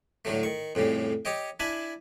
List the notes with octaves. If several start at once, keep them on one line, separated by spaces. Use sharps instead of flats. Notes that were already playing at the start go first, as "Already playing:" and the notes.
A2 D3 F#3 A3
D#3 C#6
F2 A2 C#3 G3
G4 C#5 D#5 G5
D4 E4 G#5 A5 B5